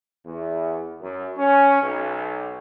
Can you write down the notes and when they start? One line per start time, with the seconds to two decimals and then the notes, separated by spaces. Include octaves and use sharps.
0.25 E2
1.00 F#2
1.37 C#4
1.82 B1